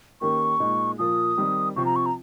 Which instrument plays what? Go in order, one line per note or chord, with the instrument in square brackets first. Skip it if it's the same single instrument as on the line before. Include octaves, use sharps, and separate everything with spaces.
[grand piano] D#3 A#3 C#4 G4 A#4 [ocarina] C#6
[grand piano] A#2 G#3 D#4
[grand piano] A#2 F3 A#3 F4 [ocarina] D#6
[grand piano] D#3 G3 C4 D#4 A#4
[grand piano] C3 F3 C4 F4 [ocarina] C#6
[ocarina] A#5
C#6
A#5